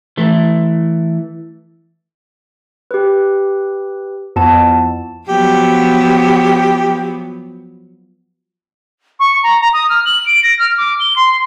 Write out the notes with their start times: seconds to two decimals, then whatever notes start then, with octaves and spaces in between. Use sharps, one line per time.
0.17 E3 A3
2.91 G4 B4
4.36 F2 B3 E4 A5
5.28 F3 F#3 B3 G4
9.19 C#6
9.43 A#5
9.60 A#5
9.73 D#6
9.89 F6
10.05 F#7
10.26 D7
10.43 A#6
10.59 F6
10.78 D6
11.00 G7
11.16 C6